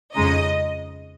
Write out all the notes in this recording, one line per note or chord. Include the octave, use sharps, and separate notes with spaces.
F2 C#3 G#3 D#4 D#5